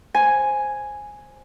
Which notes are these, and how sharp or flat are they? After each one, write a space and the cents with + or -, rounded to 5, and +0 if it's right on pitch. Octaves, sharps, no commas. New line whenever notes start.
C5 +10 G#5 +0